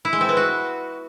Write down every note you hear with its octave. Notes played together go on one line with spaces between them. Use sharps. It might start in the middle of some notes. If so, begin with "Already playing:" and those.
E4
G#3
C4
B3
F#4